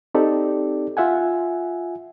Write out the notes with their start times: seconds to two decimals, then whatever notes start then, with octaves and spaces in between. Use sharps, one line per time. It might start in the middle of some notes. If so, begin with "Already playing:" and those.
0.14 C4 D#4 G4 A4 D5
0.97 F4 E5 F#5 G#5